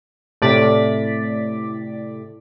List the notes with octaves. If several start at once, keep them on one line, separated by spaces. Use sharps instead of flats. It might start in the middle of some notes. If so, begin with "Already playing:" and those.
A2 C3 D5 D6 A6 B6